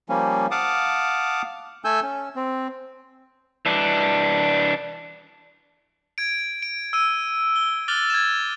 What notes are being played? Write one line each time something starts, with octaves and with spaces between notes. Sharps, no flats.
F3 G3 A#3 C#4
F5 F#5 A5 D6 D#6
A3 A4 G#5 E6 G6
C#4
C4
E3 D4
G#6 D7
D7
E6 D#7
G7
D6 F6 F#6 A6 F#7 G7
G#6 E7